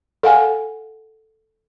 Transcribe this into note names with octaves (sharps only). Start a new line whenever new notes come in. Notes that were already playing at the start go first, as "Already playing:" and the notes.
A4 F5 F#5 G#5